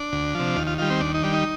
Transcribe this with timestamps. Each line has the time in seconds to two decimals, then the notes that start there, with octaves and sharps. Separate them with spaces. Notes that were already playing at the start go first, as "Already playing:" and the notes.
Already playing: D4
0.12 D2
0.35 C3 F3
0.56 D#2 F4
0.67 F4
0.78 D#3 G3 F4
0.90 C4
1.01 D#2 D4
1.14 D#4
1.22 D#3 G3 D4
1.34 D#4